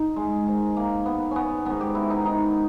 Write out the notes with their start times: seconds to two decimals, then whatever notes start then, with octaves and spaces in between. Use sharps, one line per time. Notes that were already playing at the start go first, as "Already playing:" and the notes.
Already playing: D#4
0.16 G#3
0.46 G#2 D#3
0.77 A#3
1.06 B3
1.31 B3 C#4
1.65 G#2 D#3 B3
1.81 G4
1.95 E4
2.10 D#4
2.25 D#4